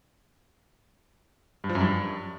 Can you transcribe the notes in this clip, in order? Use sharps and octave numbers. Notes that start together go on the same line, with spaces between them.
G2
F3
F#2
G2